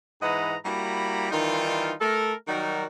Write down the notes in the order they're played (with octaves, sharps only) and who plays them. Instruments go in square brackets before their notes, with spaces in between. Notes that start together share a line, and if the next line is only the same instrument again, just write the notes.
[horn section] G#2 E3 B4 D#5 F#5 A#5
G3 A#3 E4 F#4 A#5 B5
D#3 E3 G3 D#4 F4
A3 A4 A#4
D#3 F#3 G3 D#4 F#4 A#4